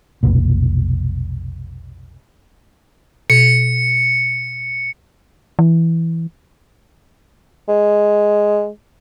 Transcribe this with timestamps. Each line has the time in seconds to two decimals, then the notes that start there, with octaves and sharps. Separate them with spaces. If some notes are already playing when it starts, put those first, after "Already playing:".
0.23 F1 B1 A#2
3.30 B2 C#7
5.59 E3
7.68 G#3